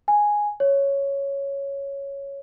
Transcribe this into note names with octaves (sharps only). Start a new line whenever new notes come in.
G#5
C#5